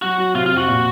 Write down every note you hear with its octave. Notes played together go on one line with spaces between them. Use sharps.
F#3 F#4
F#3
C3 F4
F2 F4
F#4
A#2